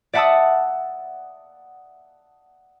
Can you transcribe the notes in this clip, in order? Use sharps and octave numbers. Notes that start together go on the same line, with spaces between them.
D5 E5 F#5 A5 D#6 E6